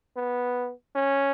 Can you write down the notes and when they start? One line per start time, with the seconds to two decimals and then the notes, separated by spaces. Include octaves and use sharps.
0.16 B3
0.96 C#4